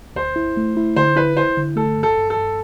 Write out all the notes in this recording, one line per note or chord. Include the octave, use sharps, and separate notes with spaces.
D2 C5
E4
A3
E4
D3 C5
E4 B4
E4 C5
D3
A3 A4
G2
A4
G2
A4
G2